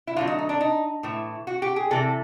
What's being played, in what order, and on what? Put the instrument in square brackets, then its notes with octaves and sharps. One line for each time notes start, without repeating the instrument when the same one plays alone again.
[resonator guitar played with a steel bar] E4
D3 F#3 A3 F4
D#4
D#4
D4
D#4
A2 E3 A3
F#4
G4
G#4
C3 E3 G3 A4